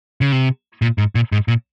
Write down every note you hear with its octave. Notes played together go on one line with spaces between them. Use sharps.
C#3
C3
A#2
G#2
A#2
G#2
A#2